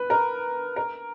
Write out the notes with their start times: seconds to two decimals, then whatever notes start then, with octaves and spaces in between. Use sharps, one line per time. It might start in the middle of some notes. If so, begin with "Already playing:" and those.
Already playing: B4
0.10 A#4
0.76 A#4